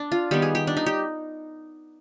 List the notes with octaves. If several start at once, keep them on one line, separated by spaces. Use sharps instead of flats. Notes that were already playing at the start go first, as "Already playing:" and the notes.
Already playing: D4
F4
D#3 G3 B3 G4
G#4
G4
D4
D#4
G4